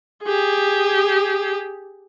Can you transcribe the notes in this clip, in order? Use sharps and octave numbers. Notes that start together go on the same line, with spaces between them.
G4 G#4